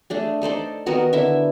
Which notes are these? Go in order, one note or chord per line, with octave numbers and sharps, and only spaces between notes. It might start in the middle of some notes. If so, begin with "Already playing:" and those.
A3 D4 G#4
D#4 A4 C5 D5
D#3 B3 F#4 A#4
D3 E4 E5